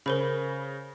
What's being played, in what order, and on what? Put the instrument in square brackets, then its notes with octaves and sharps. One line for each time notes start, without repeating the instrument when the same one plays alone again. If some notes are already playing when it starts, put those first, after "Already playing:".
[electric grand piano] C#3 [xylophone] A#4 C5 B5